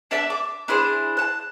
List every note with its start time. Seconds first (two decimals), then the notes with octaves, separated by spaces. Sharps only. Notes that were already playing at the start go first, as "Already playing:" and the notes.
0.11 D4 D5 E5 A5
0.30 D6
0.68 D4 E4 G#4 C5
1.17 A5 F#6